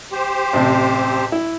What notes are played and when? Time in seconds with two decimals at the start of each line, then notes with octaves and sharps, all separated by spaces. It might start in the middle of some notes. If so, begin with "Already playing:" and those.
0.12 G4 C5
0.53 A1 C3
1.32 E4